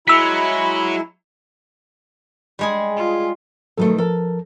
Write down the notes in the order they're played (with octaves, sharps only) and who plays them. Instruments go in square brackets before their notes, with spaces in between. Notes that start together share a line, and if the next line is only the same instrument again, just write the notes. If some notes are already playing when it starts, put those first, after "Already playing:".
[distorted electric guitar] F#3 [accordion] G#3 E4 [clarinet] B5 [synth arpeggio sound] E6 B6
[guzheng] G3 G#3 G#4
[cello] F4
[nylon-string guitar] B2 D#3 A3 [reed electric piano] F#3 A4
[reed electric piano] F3 A#4 [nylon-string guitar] A4